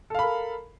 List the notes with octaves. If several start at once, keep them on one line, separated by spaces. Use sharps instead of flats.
A4 A#4 F5 B5